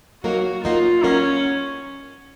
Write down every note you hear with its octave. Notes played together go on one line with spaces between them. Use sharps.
F#3 A#3 D#4 F#4 A#4
F#3 A#3 D#4 F4 A#4
F#3 A#3 C#4 D#4 A#4